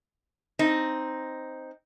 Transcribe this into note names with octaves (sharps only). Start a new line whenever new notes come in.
C4 D#4